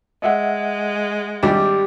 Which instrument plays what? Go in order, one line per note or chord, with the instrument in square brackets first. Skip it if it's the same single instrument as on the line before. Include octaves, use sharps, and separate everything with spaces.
[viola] G#3 [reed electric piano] D#5 E5 F#5
[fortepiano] G#1 G3 D4 [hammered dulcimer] G4